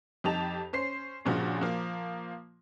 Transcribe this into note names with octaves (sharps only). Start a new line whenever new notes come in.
F2 D#4 G4 A5 F7
C#4 C5 C7
G2 A#2 C#3 F3 G#3 F#4
F3 A#3